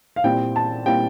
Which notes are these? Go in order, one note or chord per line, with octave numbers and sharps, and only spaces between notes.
F5
A#2 G3 C4 E4 G5
A5
A#2 G3 C4 E4 G5